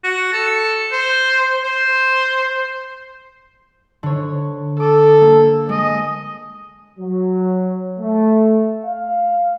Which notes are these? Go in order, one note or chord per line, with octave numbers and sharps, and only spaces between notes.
F#4
A4
C5
C5
D3 C#5
A4 D6 D#6
A#3
G#3 D#5
F#3
A3
F5